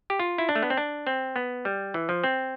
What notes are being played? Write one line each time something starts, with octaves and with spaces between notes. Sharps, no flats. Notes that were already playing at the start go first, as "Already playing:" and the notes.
G4
F4
E4
D4
A3
B3
C4
D4
C4
B3
G3
E3
F3
C4